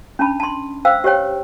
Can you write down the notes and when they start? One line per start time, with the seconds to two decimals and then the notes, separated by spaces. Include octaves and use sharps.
0.19 C#4 D4 A5 B5
0.40 A5 C6
0.85 C5 F5 G5 E6
1.04 G4 C5 C#5 G5